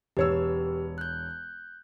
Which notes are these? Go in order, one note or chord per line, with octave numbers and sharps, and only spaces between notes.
E1 G4 B4 C#5 E6
F#6 G6